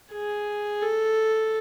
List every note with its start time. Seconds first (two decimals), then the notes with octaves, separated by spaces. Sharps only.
0.12 G#4
0.82 A4